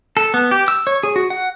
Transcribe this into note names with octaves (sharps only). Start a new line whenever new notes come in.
A4
B3
G4
E6
C#5
G#4
F#4
F#5